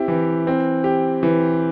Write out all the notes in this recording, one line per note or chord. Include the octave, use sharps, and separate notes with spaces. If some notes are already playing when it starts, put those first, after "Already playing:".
Already playing: C4 E4 G4
E3
C4
G4
E3